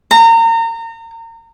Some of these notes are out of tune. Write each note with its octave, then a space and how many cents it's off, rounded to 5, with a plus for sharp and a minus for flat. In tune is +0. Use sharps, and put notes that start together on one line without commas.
A#5 -30